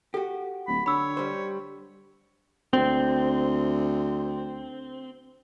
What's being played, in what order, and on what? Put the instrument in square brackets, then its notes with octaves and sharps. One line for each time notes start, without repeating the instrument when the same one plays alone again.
[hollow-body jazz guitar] F#4 G4 [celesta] A4
[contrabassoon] D1 [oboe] B5
[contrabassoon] D3 [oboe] C#5 [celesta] B5 E6
[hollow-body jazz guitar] G3 C5
[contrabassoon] D2 [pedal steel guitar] C4